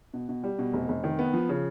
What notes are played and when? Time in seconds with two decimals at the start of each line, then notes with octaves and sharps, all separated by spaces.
0.14 B2
0.29 B2
0.43 G3
0.59 B2
0.73 F1
0.89 F1
1.04 D#3
1.19 B3
1.34 F3
1.49 C#3